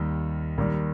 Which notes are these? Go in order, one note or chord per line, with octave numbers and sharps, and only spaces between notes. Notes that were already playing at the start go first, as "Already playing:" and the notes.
Already playing: D#2 D#3 G3
D#2 D#3 G3